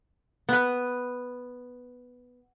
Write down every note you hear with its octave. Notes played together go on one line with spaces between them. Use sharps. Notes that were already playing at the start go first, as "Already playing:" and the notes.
B3 B4